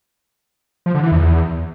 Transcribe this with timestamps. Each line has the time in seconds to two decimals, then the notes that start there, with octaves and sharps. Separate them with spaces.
0.86 F3
0.95 D3
1.03 E3
1.12 E2